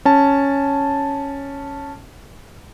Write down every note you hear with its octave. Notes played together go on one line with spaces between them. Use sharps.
C#4 A5